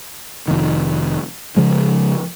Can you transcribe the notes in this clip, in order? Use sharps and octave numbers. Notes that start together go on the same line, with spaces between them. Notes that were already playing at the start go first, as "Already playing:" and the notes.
F1 D#3
C#3 F3 G#3